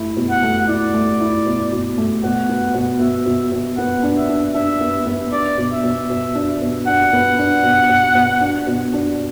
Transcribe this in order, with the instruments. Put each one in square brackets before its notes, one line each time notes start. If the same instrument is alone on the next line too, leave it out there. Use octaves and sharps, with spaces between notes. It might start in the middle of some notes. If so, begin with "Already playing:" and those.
Already playing: [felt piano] A3 E4
B2
[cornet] F#5
[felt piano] A3
[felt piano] E4 [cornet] D5
[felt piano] A3
E4
B2
B2
A3
[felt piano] B2 [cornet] F#5
[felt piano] B3
B2
[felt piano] B2 [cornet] E5
[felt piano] B2
B2
[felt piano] B3 [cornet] F#5
[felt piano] D4
[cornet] E5
[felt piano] D4
[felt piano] D4 [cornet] E5
[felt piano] B3
B3
[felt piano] D4 [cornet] D5
[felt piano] B2
[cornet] E5
[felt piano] B2
B2
D4
B2
[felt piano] D4 [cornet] F#5
[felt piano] B3
D4
B2
B2
B2
D4
B2
D4